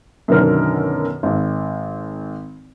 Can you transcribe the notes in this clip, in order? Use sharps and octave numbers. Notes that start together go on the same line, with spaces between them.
F#2 B2 D3 D#3 A#4 F6
G#1